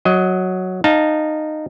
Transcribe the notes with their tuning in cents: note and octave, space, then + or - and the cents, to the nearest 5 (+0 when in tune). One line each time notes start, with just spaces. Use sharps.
F#3 +0 D#5 +20
D#4 -15 F5 +0 A5 +0